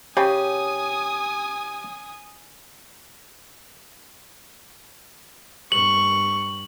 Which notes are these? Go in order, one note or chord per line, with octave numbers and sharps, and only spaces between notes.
C#3 G4 G#5 D#6
G2 C#6 F#7